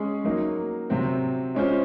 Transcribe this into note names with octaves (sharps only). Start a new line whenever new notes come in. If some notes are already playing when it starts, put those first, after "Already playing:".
Already playing: G#3 C#4 G#4
F#3 A#3 D#4
C3 F#3 C4
G#3 C#4 F4 C5